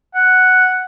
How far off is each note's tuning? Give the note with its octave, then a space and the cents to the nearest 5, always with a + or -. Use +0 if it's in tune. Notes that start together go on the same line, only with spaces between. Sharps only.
F#5 +0